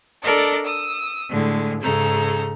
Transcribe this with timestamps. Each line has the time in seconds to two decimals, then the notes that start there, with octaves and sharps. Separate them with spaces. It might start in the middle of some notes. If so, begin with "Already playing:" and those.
0.23 D4 A4 A#4 D5 D#5
0.66 D#6 E6
1.29 A2 D3 G#3
1.83 G#2 C#3 A4 A#5 G6